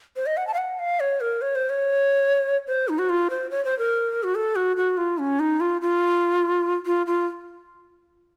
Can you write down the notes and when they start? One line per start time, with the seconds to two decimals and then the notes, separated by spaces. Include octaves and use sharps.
0.16 C5
0.26 D#5
0.37 F#5
0.47 A5
0.54 F5
0.58 F#5
0.79 F5
1.00 C#5
1.21 A#4
1.42 C#5
1.55 C5
1.70 C#5
2.67 C5
2.89 D#4
2.99 F#4
3.09 F4
3.30 C5
3.51 C#5
3.65 C5
3.79 A#4
4.23 F#4
4.35 A4
4.56 F#4
4.77 F#4
4.97 F4
5.18 C#4
5.40 D#4
5.60 F4
5.82 F4
6.86 F4
7.07 F4